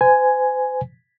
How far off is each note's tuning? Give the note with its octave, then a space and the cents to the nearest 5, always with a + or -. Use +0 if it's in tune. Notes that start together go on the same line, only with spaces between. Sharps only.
C5 -40 G#5 +5